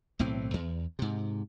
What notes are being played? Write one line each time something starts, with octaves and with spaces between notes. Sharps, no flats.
B1 A2 E3 C4
E2
G#2 C3